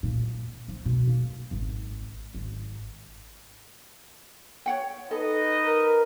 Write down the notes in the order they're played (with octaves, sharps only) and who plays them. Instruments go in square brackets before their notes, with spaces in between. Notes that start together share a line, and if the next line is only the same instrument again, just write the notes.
[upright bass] A#2
F3
B2
A#3
G#1
G#1
[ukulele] C#5 F#5 G5
[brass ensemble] D#4 B4 D#5 [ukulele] A4
[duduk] A#4